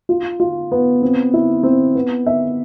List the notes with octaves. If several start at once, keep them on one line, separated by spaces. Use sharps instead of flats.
F4
F4
B3
C4
E4
C4
B3
E5